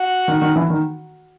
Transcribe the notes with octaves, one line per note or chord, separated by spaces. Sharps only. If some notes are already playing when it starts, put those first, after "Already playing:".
Already playing: F#4
D#3
D#3
E3
D#3